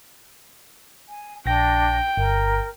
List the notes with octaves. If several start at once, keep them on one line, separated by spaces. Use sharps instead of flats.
G#5
A#1 D4 G5 A#6
G1 A#4